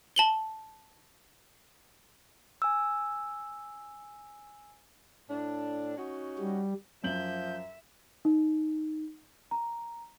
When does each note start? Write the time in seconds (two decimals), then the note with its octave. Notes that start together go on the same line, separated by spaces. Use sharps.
0.16 A5 F#7 G7
2.62 G#5 E6
5.30 A2 D4
5.97 C#4 D#4 F#4
6.39 G3
7.04 F#2 F3 E5 G6 F#7
8.25 D#4
9.51 A#5